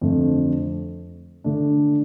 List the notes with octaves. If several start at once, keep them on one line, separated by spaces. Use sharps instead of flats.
F2 D3 A3
D3 A3 D4